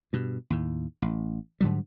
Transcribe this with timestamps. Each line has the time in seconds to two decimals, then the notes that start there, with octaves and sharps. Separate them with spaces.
0.13 G2 B2
0.50 D#2 A2
1.02 A1
1.61 G#2 D3 F#3 G3